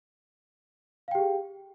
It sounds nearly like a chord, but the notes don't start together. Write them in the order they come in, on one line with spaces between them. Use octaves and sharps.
F5 G5 G4 G#4